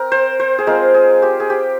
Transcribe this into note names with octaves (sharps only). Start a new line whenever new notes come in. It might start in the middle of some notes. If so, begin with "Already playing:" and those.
Already playing: C4 A#4
C5
C5
G#4
G#3 C4 F4 A#4
G#4
G4
G#4
G4